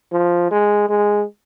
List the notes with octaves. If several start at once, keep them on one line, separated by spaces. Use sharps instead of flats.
F3
G#3
G#3